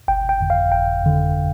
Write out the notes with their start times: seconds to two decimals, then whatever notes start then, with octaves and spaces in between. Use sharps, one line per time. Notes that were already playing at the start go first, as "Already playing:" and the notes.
0.08 G1 G5
0.29 G5
0.41 F2 D3
0.50 F5
0.72 G1 G5
1.03 F2 D3